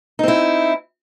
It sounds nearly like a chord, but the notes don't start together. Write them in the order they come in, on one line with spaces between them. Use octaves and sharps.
D#4 C4 E4